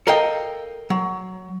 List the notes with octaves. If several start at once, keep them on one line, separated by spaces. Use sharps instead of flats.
A4 A#4 D#5 F5 G5
F#3